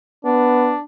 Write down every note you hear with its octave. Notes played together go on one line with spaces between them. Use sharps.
B3 D4